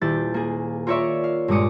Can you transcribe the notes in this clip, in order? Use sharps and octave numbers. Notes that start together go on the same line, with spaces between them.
D#1 E4 G4 A6
A#3 G#4
F4 A#4 C#5 D5 E5 C#6
F5
G2 A#2 G#3 D6 D#6 C#7